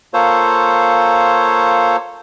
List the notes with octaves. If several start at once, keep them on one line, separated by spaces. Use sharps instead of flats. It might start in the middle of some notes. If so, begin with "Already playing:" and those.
A#3 F4 A4 C5 C#5